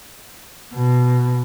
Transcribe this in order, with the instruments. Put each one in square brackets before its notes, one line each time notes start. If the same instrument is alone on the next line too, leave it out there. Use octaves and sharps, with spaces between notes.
[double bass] B2